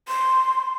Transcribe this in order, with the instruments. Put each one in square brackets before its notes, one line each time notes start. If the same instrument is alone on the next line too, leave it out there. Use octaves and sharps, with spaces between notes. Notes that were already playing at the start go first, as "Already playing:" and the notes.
[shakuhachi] C6